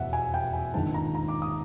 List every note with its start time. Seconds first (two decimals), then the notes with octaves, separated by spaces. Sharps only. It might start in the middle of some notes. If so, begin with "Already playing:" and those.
Already playing: F1 E2 B2 E5 F#5
0.13 G#5
0.34 G5
0.53 G#5
0.74 A#1 G#2 D#3 G#3 A5
0.94 A#5
1.15 A#5
1.28 D6
1.42 D#6